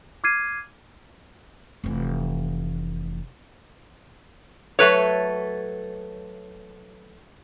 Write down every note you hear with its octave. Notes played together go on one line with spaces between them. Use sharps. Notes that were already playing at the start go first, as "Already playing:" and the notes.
D6 F6 G#6 C7 D#7
F1 E3
F#3 A3 B4 C#5